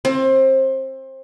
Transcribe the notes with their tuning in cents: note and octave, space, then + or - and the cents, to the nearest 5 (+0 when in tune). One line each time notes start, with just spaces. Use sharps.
C4 +25